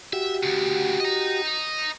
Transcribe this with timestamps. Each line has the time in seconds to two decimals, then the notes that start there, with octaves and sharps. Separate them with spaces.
0.13 F#4 G4 E5
0.43 D2 C#3
1.00 D#5 A#5